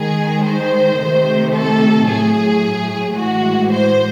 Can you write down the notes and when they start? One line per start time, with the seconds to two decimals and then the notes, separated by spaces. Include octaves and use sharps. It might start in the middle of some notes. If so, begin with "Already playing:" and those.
Already playing: D#3 G#3 G#4
0.45 C5
0.99 C3 D#3 A3
1.54 A4
2.08 A2 F#3 A3 G#4
3.16 A2 E3 G#3 F#4
3.71 C5